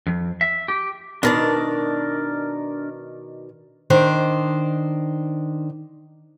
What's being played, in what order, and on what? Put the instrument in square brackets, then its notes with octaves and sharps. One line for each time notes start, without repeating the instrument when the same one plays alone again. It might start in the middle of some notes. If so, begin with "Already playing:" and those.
[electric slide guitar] F2
E5
G4
[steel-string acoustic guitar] B2 D#3 D5 [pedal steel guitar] D4 A#4 A5
[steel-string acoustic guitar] D#3 D4 C5